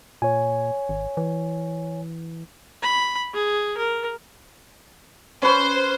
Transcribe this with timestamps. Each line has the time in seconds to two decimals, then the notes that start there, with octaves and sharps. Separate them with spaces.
0.22 A#2 C#5 G#5
0.89 G#1
1.17 E3
2.82 B5
3.34 G#4
3.77 A#4
5.42 C#4 B4 C5